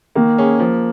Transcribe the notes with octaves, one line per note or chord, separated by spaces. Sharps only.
D#3 A#3
C#4 G#4
F3